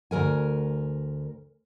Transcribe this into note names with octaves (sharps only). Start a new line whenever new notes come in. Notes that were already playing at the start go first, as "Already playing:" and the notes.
D2 D#3 A#4 G#5